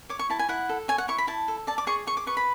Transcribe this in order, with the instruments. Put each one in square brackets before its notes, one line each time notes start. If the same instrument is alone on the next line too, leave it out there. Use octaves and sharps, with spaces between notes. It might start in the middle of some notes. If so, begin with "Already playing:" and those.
[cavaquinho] C#5 D6
C#6
E4 A5
G#5
E4 F#5
A4
C#5 G#5
F#5
E4 C#6
B5
E4 A5
A4
D5 A5
D6
G#4 C#6
G#4 C#6
D6
B4 C#6
B5